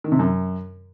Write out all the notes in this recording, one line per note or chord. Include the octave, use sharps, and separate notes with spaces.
D#3
C3
F#2